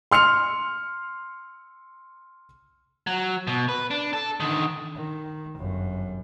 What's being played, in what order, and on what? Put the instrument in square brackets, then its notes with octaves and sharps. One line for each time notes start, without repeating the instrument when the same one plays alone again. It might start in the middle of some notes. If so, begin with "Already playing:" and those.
[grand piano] C6 F6 C#7 F7
[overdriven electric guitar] F#3
B2
B4
D4
A4
D3 D#3
[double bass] D#3
G1 F#2